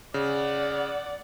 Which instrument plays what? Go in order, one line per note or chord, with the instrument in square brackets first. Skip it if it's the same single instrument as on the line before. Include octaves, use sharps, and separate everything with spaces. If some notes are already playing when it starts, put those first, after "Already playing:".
[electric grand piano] C#3 [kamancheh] D5 F#5